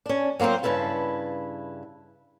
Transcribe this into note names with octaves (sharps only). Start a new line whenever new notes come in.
C#4 D4
F#3 A#3 C4 F4 C5
G2 A#2 C#3 E4 B4 A5